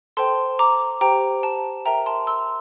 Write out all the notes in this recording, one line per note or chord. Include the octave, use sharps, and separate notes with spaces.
A4 C5 G5 A5 C6
A#5 D6
G4 C5 G5 A#5
A5
A#4 E5 G5 A#5
A5 C6
C6 E6